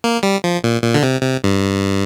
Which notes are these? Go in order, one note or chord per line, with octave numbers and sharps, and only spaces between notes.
A#3
G3
F3
A#2
A#2
D3
C3
C3
G2